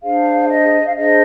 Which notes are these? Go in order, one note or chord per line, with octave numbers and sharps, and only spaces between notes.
D4 G#4 C5 F5
D#5
F5
D4 G#4 C5 D#5